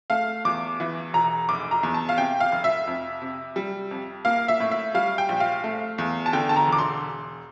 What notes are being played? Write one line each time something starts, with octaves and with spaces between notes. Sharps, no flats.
A3 F5
E2 D6
E3
E1 A#5
F1 D6
A#5
E2
A5
F5
C3 G5
F5
F1
E5
F2
C3
G3
F2
A#3 F5
E5
A2
E5
G3 F5
G5
A#1
F5
A3
E2
A5
D3 G5
A5
A#5
E1 D6
C6